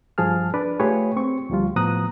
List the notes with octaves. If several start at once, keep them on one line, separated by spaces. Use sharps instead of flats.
G2 F3 G#4 A5 F6
D4 B4 D5
A3 F4 G4 G#4 B4 C#5
C4 C#6
D2 F3 G3 F4
A2 F3 B3 A#5 D#6 F#6